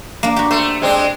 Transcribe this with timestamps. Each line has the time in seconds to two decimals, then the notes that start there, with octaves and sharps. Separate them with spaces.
0.23 A#3 D4
0.36 F#4 G4
0.51 A3 C5
0.82 G#3 C4 D4